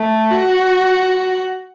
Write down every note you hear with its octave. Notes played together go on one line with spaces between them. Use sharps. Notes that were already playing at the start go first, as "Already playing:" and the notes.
Already playing: A3
F#4